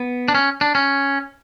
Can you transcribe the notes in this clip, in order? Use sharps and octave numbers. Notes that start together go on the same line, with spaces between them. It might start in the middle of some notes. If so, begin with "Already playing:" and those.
Already playing: B3
D4
C#4
D4
C#4